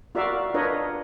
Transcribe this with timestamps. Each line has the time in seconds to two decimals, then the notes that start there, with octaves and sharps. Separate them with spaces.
0.15 F4 F#4 A#4 D5 E5 F5
0.54 D4 F4 A#4 B4 C#5 D#5